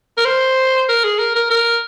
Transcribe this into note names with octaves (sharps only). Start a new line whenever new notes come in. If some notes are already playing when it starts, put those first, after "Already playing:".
A#4
C5
A#4
G#4
A#4
A#4
A#4